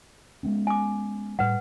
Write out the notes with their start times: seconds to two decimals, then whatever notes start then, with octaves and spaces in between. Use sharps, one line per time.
0.43 G#3 B3 C#4
0.67 G#5 D6
1.39 A2 G3 B4 F#5